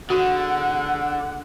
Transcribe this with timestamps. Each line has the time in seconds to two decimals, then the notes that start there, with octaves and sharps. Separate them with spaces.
0.10 D3 F#4 G#4 F#5